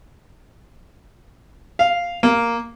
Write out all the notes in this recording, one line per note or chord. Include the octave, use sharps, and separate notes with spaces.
F5
A#3